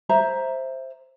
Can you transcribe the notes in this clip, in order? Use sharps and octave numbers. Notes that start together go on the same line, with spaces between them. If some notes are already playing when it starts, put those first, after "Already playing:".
C5 E5 A#5